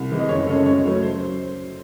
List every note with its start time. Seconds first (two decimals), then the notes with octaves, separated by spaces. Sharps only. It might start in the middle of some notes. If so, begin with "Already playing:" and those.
Already playing: C2
0.11 C3 E3 G#3
0.19 D#5
0.29 F#1 C#5
0.47 F#2 C#3 G#3 A4
0.57 D#5
0.66 F#2 C#5
0.84 C#3 F#3 A3
1.02 C5